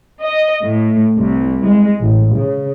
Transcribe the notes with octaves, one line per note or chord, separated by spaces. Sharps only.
D#5
A2
C2
G#3
A1
C#3